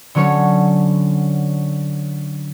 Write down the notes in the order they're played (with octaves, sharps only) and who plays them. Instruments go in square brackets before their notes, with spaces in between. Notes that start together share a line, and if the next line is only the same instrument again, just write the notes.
[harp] D3 F#3 C#4 A4 C#5